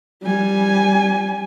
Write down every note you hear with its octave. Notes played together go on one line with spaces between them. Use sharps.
G3 G#5